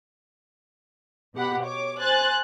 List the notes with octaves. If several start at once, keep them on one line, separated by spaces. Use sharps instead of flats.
B2 G4 F#5 B5
C#5 D6
C5 G#5 F#6 A6